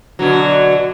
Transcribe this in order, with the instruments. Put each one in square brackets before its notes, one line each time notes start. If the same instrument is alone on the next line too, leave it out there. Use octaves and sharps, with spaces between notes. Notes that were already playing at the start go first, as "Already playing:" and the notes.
[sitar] B2 D3 F#3